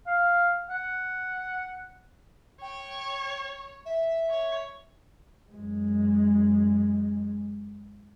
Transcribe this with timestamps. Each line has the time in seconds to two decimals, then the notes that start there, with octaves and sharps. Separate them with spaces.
0.07 F5
0.70 F#5
2.62 C#5 G5
3.86 E5
4.30 C#5
5.51 F#2 G#3